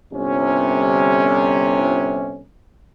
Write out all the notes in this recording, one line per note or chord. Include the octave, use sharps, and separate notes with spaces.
G1 C3 C#4